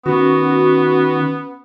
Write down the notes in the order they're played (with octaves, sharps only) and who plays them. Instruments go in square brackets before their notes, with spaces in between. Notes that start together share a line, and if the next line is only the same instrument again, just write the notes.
[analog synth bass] D#3 [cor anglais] B3 [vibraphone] C#4 [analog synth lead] F#4